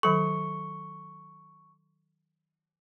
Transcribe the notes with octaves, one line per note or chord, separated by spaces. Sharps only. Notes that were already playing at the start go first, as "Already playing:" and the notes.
D#3 F#3 A4 C#6